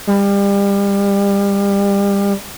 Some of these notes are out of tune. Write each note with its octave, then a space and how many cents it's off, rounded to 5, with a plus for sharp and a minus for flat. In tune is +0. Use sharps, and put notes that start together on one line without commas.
G3 +30